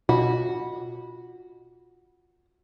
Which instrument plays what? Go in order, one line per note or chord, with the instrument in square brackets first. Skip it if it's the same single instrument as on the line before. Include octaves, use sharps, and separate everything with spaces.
[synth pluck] B2 [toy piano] F4 [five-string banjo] F#4